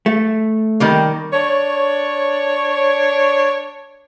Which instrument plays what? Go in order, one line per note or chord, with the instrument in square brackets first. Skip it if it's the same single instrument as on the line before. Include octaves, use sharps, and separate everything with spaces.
[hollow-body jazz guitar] A3
[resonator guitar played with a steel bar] D#3 G3 A#3
[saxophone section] D4 C#5